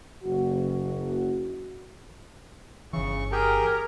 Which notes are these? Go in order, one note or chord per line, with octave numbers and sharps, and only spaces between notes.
F#1 F#4
G1 C#3 E3 C#6
G4 G#4 A#4 G5